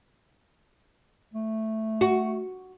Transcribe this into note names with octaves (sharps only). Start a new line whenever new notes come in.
A3
F#4